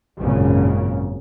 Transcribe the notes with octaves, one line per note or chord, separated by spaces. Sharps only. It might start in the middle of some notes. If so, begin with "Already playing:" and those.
G#1 F#2 A#2 C#3